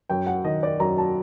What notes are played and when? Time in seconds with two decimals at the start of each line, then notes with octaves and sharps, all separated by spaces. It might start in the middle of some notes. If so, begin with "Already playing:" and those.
0.10 F#2 G5
0.27 F#5
0.44 D#3 D#5
0.63 D5
0.80 F#2 A#5
0.98 A5